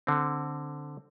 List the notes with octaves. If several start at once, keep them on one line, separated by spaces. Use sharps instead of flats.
D3 C4